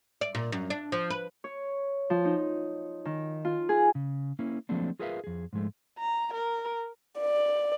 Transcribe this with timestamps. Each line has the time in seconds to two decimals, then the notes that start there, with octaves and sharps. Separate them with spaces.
0.21 D5
0.35 A#2
0.52 F#2
0.70 D4
0.92 F3
1.10 B4
1.44 C#5
2.10 F3
2.25 D#4
3.05 D#3
3.45 F4
3.69 G#4
3.95 C#3
4.39 A#3 C#4 E4
4.69 F3 F#3 A3 A#3 C4 D4
4.99 F4 G#4 A#4 B4 E5 F5
5.24 F2 G#4
5.53 G#2 F3 G#3 A3
5.99 A#5
6.34 A#4
7.20 D5